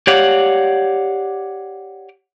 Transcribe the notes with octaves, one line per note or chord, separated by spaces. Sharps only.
G4 C#5 D5 F5 F#5